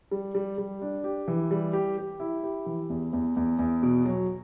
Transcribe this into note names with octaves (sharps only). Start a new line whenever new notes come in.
G3
G3
G3
D4
G4
E3
G3
G4
G4
E4
G4
E3
E2
E2
E2
E2
B2
F#3